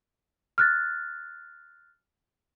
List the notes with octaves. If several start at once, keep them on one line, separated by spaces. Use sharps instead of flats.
F6 F#6 A6